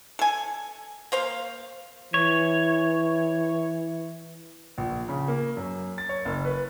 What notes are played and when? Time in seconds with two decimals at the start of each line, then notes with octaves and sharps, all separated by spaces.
0.19 A4 G#5
1.12 A#3 C5 F5
2.14 E3 C#5
4.78 A#1
5.09 C#3
5.28 A#3
5.57 F#2
5.98 A6
6.09 C#5
6.25 F#1
6.45 B4